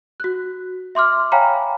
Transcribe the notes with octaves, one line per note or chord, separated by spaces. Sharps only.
F#4 F#6
E5 C6 D6 F6
C#5 F5 G5 G#5 A#5 B5